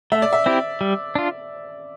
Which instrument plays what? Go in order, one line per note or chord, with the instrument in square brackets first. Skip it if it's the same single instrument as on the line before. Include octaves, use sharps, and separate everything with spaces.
[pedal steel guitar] A3 [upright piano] E5
[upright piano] D5
E5
[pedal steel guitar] C4 E4 G4
G3
D4 F4